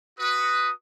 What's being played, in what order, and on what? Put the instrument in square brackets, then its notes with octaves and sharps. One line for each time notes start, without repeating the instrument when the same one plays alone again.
[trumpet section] F#4 B4 [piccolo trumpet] D#6